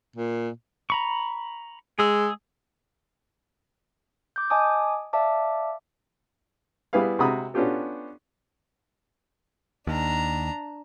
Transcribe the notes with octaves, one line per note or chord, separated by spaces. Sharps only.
A#2
A#5 B5 C#6
G#3 G#4 E6
D6 G6
D#5 G#5 A5 D6 D#6
D5 E5 F5 A5 D6
G3 B3 E4 G#4 B4 F5
C3 G#3 F#4 A#5 B5 D#6
B3 C#4 D4 F4 G4 A4
D#2 D4 A#5